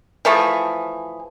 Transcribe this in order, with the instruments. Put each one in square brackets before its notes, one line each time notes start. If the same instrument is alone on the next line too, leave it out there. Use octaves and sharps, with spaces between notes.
[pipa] E3 F3 A3 G#4